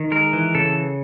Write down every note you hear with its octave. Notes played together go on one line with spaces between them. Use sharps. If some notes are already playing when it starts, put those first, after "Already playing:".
Already playing: D#3
G#3 A#4
E3
C#3 A4